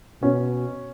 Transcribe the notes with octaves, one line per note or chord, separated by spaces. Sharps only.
B2 C#4